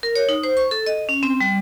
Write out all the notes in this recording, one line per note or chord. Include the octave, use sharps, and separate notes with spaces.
A#4
C#5
D#4
C5
C#6
A4
D#5
C#4
C4
G3